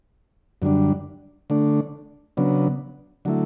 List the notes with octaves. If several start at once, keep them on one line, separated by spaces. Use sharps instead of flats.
F#2 D3 G3 D4
D3 A3 D4
C#3 F#3 B3 D4
D3 F#3 A3 E4